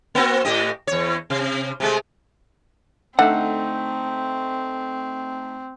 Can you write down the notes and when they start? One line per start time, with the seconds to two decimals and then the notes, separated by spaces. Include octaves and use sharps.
0.15 A#3 C4 F#4
0.45 A2 G4 D#5
0.87 E2 C#5
1.30 C3
1.80 C3 G#3 A3
3.19 D3 A3 C4 D#4 E5 F#5